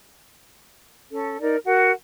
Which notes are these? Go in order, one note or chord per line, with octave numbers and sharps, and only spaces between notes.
C#4 A4
D#4 A#4 D5
F#4 A#4 F#5